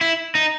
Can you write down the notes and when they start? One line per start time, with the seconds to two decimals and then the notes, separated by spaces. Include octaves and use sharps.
0.01 E4
0.35 D#4